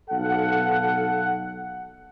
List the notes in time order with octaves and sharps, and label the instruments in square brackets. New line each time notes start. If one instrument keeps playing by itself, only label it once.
[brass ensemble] B1 A4 F5 F#5